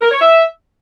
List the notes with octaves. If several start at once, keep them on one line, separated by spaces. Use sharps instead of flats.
A#4
C#5
E5